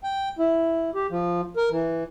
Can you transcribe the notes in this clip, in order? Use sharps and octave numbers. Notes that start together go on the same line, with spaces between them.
G5
E4
G4
F3
A#4
E3